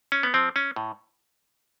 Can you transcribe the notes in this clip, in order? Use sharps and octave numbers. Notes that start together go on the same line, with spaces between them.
C#4
B3
F3 C4
C#4
A2